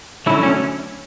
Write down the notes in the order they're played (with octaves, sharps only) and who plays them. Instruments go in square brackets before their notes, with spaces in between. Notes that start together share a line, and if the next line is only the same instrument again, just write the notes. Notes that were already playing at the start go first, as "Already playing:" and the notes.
[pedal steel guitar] D3 F#3 A3 C#4 E4
C#4